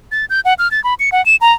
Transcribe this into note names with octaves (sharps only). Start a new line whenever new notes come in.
A6
G6
F#5
F6
A6
B5
C#7
F#5
E7
A#5